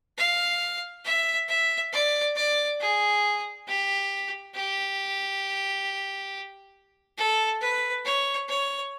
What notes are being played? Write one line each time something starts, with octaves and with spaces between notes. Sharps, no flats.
F5
E5
E5
D5
D5
G#4
G4
G4
A4
B4
C#5
C#5